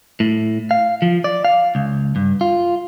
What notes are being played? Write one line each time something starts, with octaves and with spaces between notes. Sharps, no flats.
A2
F5
F3
D5
F5
C#2
G2
F4